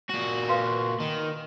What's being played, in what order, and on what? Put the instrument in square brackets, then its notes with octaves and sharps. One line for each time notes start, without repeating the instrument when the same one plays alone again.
[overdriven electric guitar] A#2 F#4
[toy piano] B4 F5 C6
[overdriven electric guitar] D#3